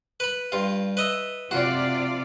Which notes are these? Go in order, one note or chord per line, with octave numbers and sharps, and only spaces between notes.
B4 B5
G2 F4
B4 D#5 E5
C3 F4 F#4 D5